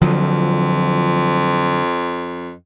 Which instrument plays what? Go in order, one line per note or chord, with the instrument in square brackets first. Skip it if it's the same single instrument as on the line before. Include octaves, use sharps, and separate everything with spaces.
[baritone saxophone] F2 [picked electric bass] D3 F3 F#3